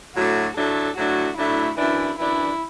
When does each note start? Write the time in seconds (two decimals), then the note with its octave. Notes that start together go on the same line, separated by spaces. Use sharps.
0.15 A2 F#3 A3 D4 F#4
0.56 A2 F#3 A3 D4 A4
0.96 A2 F#3 A3 D4 F#4
1.37 A2 F#3 A3 D4 E4
1.77 F#2 E3 D4 E4
2.18 F#2 E3 D4 E4